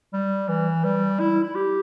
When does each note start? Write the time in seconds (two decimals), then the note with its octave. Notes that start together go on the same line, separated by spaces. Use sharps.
0.13 G3
0.49 E3
0.85 G3
1.20 E4
1.44 E4
1.55 G4